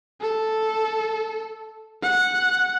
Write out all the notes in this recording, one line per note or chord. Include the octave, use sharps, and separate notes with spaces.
A4
F#5